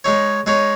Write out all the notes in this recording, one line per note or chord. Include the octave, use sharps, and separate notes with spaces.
G#3 D#4 G#4 C#5
G#3 D#4 G#4 C#5